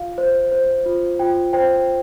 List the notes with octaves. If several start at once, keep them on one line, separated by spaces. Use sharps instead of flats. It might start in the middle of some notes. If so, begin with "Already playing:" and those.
Already playing: F4 F5
C5
C5
F4
F4 G5
C5 G5